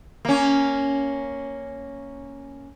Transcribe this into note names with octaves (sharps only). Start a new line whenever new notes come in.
A#3 C#4